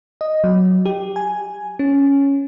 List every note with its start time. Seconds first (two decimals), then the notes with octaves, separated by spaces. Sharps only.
0.21 D#5
0.44 F#3
0.85 G4
1.16 G#5
1.79 C#4